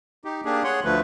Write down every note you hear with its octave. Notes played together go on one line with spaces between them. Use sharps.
D#4 G4
A#3 D4 G4 G#4
G#4 C#5 F#5 C6
D2 D3 F3 A3 B4